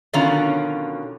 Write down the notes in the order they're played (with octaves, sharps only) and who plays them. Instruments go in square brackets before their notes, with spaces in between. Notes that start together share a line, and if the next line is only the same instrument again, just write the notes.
[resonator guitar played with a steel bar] B2 D3 D#3 F#3 C#4 F4